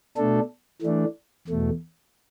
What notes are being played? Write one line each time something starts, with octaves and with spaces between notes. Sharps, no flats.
B2 A3 D4 A4
E3 A3 D4
E2 B2 A3